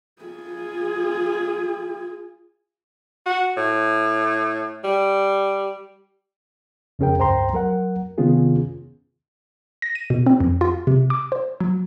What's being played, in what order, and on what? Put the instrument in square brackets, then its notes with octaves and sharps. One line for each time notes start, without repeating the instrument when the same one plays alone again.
[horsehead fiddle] F4 G#4
[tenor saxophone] F#4
A2
G3
[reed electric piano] F2 C#3 C#4 G#4 A#4 G5
C#2 G2 C5 G5 A#5 C6
F#3 A#4 F#5
C3 D#3 B3 C#4 F4 G#4
[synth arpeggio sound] A#6
D#7
B2
C4
F2
F4
C3
D6
C5
F#3